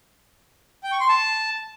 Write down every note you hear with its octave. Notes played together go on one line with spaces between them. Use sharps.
G5
C#6
C6
A5